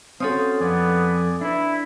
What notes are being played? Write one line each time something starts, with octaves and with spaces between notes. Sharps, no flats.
C4 C#4 F#4 A4 C5 F5 D#6
F2 B3 D5 G#5
D4 E4 B4